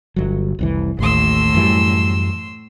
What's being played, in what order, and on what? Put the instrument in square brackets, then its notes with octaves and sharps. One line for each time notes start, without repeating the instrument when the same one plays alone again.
[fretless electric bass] G1 F#3
F1 C2 E3
[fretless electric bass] A1 D#2 [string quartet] A2 C6 E6
[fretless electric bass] F#2 E3 G3